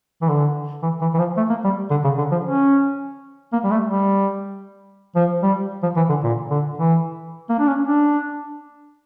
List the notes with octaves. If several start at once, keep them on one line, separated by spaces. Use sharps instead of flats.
E3
D3
E3
E3
E3
F3
A3
A#3
G3
D3
C#3
D3
F3
C#4
A#3
G3
A3
G3
F3
G3
F3
E3
D3
A#2
D3
E3
A#3
D4
C#4
D4